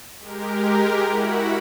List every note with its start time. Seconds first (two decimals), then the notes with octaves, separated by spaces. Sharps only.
0.19 G#3 G4 A#4
1.08 E4 F#4 F#5 B5